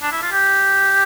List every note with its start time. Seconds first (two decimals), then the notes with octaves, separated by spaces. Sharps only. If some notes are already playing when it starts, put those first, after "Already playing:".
0.02 D4
0.12 E4
0.22 F4
0.32 G4